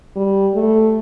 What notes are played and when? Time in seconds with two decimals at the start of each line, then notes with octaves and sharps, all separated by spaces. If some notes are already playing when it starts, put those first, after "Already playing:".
0.16 G3
0.55 A3